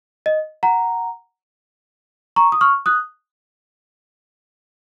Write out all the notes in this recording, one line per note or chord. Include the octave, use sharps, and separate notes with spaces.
D#5
F#5 A#5
A#5 C#6
D#6
C#6 F6
D#6 F#6